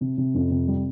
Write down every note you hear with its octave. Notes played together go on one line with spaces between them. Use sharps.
C3
C3
F2
C3
G3